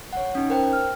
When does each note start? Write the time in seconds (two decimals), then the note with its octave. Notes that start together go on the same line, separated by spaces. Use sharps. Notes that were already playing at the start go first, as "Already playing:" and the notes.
0.13 C#5 F#5
0.35 C#4 D#4
0.50 A#4 C5 G5
0.73 F6